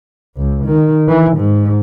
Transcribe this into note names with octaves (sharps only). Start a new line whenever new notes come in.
C#2
D#3
E3
G#2